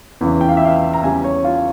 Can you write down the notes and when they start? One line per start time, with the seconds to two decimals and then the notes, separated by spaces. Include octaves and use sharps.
0.21 E2 C#3 E3
0.41 G5
0.49 F5
0.57 E5
0.65 F5
0.94 A#5
1.03 E2 C#3 G3 G#5
1.24 C#5
1.44 F4